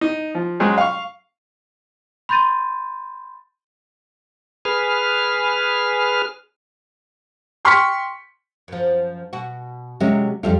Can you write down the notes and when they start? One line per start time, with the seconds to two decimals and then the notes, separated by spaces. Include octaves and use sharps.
0.01 D#4
0.35 F3
0.60 F#3 G#3 C#4 G#4 C5
0.78 F5 C#6
2.29 B5 C6 G6 A6 D#7
4.65 G#4 B4 F6
7.65 G5 C6 C#6 F6 B6 C#7
8.68 F#2 F3
9.33 B2 F#4
10.00 C3 F#3 G#3 C#4 A#4 E5
10.43 F2 G3 F4 A4 E5